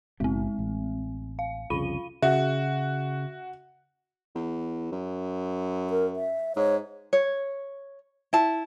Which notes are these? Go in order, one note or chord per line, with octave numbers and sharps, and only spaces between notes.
F#1 B2 G#3 C4
A1
F5
C2 F2 C#3 F4 B5 D#7
C#3 F#4 E5
E2
F#2
A#4
E5
G#2 C#5
C#5
E4 A5